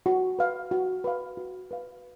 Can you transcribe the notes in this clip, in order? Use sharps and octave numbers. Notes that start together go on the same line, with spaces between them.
F#4
B4 F5
F#4
B4 F5
F#4
B4 F5